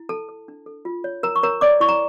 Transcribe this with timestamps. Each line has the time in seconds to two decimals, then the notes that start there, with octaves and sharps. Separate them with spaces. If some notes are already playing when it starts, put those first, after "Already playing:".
Already playing: E4
0.09 A4 A5
0.29 A4
0.48 D4
0.66 A4
0.85 F4
1.04 C#5
1.23 A#4 A#5
1.36 C#6
1.43 A#4 C#5 A#5
1.61 C#5 D5 D6
1.80 E4 C#6
1.89 A#5